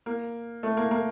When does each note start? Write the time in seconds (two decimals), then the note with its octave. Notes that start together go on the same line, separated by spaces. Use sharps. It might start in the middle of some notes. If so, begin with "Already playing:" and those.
0.06 A#3
0.63 A3
0.77 A#3
0.91 A#3